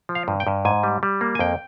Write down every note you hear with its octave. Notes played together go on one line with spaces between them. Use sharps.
F3
F5
G2
G5
G2
G#2 G#5
G3
G3
A#3
G#5
F2 G5